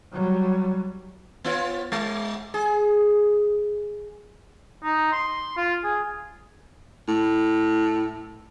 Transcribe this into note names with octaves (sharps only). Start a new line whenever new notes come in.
F#3 G3
B3 F4 C#5
G#3
G#4
D#4
C6
F4
G#4
A2